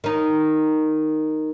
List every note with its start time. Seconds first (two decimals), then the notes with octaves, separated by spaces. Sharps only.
0.04 D#3 D#4